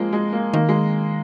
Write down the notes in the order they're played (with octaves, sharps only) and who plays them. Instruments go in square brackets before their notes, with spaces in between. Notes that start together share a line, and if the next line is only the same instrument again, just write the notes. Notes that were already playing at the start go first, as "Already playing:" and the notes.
Already playing: [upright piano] F3 G#3 A#3
G#3
A#3
[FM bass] D#3 [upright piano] A#3
[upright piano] G#3